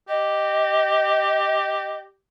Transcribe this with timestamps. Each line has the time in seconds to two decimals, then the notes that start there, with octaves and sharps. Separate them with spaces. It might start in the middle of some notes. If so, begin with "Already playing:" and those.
0.08 G4 D#5